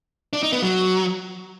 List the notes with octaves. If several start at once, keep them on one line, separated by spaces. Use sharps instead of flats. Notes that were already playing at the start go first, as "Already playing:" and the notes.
D4
D#4
B3
F#3